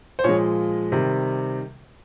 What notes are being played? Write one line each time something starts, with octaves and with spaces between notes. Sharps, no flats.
C5
A#2 F3 G#3 C#5
C3 D#3 G3